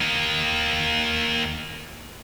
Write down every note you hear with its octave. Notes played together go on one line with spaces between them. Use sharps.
A#3 D#4